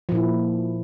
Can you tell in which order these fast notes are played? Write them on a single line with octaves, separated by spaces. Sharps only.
F3 A#2 E4